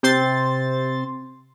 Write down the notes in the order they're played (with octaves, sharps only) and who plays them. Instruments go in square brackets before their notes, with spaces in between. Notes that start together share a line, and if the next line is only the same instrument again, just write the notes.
[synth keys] C3 C4 C5 C6 A6